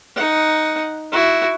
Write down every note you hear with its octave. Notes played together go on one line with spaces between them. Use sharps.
D#4 F#5
E4 F#4